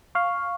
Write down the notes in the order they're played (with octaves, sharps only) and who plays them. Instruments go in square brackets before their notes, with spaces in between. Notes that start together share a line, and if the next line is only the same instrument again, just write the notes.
[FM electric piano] F5 [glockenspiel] C#6